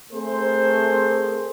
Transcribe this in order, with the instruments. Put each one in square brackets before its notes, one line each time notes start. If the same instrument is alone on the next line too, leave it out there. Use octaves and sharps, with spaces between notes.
[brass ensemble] A3 C4 G#4 A#4 C5